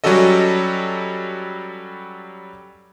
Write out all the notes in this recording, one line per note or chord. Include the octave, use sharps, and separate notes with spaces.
F#3 G3 C#4 F#4 A4 D#5